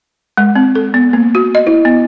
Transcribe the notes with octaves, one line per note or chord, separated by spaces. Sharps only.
G#3
C4
A4
B3
A#3
F#4
D#5
E4
B3